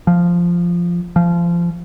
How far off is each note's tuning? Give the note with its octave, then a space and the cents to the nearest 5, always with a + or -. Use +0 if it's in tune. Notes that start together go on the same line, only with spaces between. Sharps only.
F3 -5
F3 -25